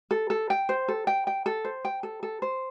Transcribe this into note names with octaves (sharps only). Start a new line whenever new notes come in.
A4
A4
G5
C5
A4
G5
G5
A4
C5
G5
A4
A4
C5